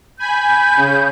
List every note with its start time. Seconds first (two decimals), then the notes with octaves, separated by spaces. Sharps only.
0.19 G#5 B5 G6
0.77 C#3